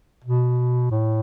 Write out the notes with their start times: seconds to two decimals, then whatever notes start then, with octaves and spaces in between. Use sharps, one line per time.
0.24 B2
0.91 A2